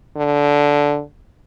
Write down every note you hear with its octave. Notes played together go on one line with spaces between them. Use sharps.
D3